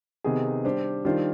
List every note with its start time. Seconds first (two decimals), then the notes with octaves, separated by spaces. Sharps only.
0.24 C3 D#3 B3 D#4 G#4
0.64 G3 D4 G4 C5
1.05 D#3 G3 D4 F4 C5